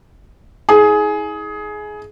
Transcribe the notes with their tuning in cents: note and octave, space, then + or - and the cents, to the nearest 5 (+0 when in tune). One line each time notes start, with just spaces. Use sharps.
E4 -45 G#4 +15